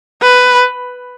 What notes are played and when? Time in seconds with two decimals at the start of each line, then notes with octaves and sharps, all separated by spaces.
0.22 B4